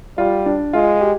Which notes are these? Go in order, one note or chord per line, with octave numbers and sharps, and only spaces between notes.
G3 F4
D4
G#3 F4
G4